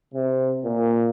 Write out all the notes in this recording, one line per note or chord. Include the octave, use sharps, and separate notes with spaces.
C3
A#2